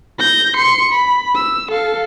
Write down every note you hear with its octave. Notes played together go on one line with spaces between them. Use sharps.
G6 A#6
C6 C#7
B5
E6
A4 F5